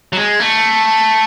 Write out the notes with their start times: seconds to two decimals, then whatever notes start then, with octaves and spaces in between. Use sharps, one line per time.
0.13 F#3
0.17 G#3
0.40 A3